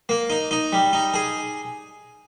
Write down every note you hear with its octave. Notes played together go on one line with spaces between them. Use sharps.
A#3
D#4
D#4
G3
D#4
G#4